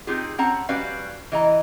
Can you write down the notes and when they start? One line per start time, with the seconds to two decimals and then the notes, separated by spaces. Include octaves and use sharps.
0.07 C4 D#4 F4 G4 G#4
0.38 C4 C#4 F#5 A5 A#5
0.69 G3 C#4 F#4 B4 D5 F5
1.32 E3 D#5 A#5